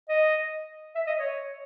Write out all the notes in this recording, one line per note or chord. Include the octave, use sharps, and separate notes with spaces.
D#5
E5
D#5
C#5